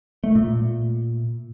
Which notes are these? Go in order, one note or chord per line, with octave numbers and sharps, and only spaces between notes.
A3
A#2